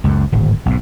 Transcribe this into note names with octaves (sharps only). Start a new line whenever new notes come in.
C#2 F#2
D1 G#1
B1 G#2